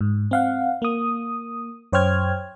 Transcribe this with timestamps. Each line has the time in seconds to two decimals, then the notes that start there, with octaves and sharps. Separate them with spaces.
0.01 G#2
0.31 C4 F5 F#5
0.82 A#3 D#6
1.92 F#2 C5 C#5 G5 F6 G#6